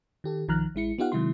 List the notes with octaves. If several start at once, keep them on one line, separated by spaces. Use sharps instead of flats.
D#3 G4 A4
B1 D#3 F3 A#5 F6 F#6
A1 G#3 E4 C#7
B3 D#4 F4 G4 F5 F#5
C3 D#3 F#3 G#3 E4 C6